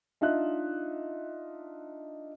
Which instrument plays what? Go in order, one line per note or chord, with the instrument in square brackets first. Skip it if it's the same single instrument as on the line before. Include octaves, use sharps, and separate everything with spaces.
[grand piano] D4 D#4 F4 E5 F#6